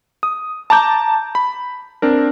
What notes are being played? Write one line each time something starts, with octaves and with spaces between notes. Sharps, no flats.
D#6
A5 A#5 D6 G6
B5
C4 D4 A#4